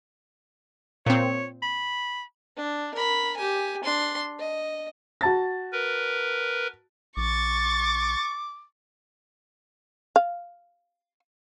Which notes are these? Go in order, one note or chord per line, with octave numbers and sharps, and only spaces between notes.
A#2 C4 C#5
B5
D4
A#4 B5
G4 G#5
D4 C6
D#5
F#4 A5 A6
A#4 B4
A#1 C#6 D6 A6
F5